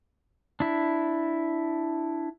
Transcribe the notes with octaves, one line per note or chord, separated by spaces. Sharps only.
D4 E4